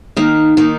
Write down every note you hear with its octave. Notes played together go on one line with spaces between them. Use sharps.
D#3 A#3 D#4
D#3 A#3 D#4